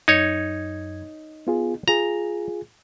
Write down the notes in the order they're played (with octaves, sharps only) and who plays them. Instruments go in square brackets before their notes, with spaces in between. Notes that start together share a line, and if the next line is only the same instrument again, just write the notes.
[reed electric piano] F#2 G#6 [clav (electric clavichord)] D#4 C#5
[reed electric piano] B3 F4 G#4
[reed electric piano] F4 G#4 [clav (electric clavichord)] A#5